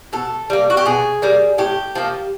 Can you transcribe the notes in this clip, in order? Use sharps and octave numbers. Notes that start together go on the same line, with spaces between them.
B2 A4
G3 A#3
F#4
G4
B2 G#4
G3 A#3
A2 G4
F3 A#3